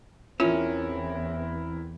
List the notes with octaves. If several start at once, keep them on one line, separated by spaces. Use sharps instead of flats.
E2 E3 C4 C#4 E4 F4 A#4